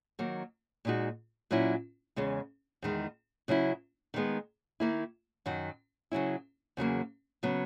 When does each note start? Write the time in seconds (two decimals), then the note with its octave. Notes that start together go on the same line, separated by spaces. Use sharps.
0.19 D#3 F#3 A#3
0.85 A#2 G#3 D#4 F#4
1.51 A#2 F#3 C#4 E4
2.16 E2 C#3 G#3
2.82 E2 D#3 G#3
3.48 C#3 F#3 C#4 E4
4.14 D#3 G#3 B3
4.80 D#3 A#3 E4
5.46 F#2 D#3 F#3
6.12 C#3 F#3 C#4 E4
6.77 E2 C#3 F#3 A#3
7.43 C#3 F#3 B3